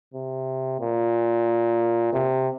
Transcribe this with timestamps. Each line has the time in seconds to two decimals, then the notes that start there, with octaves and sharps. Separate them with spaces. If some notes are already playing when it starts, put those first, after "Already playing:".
0.14 C3
0.80 A#2
2.13 C3